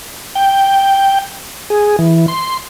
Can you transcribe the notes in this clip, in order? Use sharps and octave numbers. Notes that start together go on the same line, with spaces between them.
G5
G#4
E3
C6